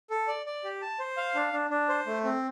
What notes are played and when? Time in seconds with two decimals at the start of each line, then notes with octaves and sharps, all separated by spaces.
0.10 A4
0.28 D5
0.46 D5
0.64 G4
0.82 A5
0.99 C5
1.17 F5
1.35 D4
1.53 D4
1.70 D4
1.89 C5
2.07 A3
2.24 C4